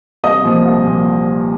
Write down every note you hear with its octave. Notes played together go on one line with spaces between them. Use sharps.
C2 D#5 D#6
A#2 F3
C2
A#2 F3